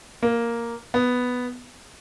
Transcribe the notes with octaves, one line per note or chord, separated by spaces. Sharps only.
A#3
B3